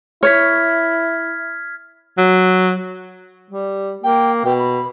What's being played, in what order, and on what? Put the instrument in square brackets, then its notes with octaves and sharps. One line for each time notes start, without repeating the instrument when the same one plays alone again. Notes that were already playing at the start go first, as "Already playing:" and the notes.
[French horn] E4 [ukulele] C#5 [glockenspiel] F6 G#6 B6
[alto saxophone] F#3
[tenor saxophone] G3
[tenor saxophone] A#3 [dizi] G5
[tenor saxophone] B2 [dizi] G5
[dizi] B5